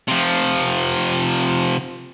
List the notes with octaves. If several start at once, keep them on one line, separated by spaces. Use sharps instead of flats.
C3 F3